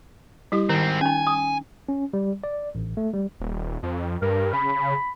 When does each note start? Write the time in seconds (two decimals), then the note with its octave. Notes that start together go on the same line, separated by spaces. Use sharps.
0.52 G3 E4 G4
0.70 G#2 D#3 C4
1.01 C#4 D#4 G#5
1.27 D#6
1.89 C#4
2.13 G3
2.44 D5
2.75 A1
2.97 A3
3.13 G3
3.40 D#1
3.83 F2
4.22 G2 A#4
4.53 C#3 B5